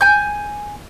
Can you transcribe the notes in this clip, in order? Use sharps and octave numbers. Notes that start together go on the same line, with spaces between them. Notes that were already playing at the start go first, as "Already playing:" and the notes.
G#5 G6